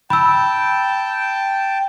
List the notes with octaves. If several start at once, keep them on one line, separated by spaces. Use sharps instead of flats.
G5 A5 B5 E6